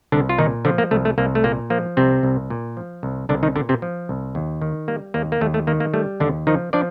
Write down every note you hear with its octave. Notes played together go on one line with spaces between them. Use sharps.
C2 D3 D4
F4
A#2 D#3 D#4
D3 F3 D4
A#3
C2 A3
A3
C2 A#3
A3
A#2 A#3
F3 A#3
C2 C3 C4
C2
A#2
F3
C2
C2 D3 D4
D#3 D#4
A#2 D3 D4
C3 C4
F3
C2
D#2
D#3
G3 A#3
D#2 A#3
A#3
D#2 A3
A3
D#3 A#3
A#3
G3 A3
D#2 D3 D4
D#3 F3 D#4
F3 D4 D5